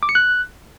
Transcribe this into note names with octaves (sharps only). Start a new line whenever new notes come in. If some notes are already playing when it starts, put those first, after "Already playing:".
D6
C#7
F#6